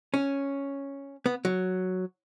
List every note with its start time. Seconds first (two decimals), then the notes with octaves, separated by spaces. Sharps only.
0.14 C#4
1.26 B3
1.45 F#3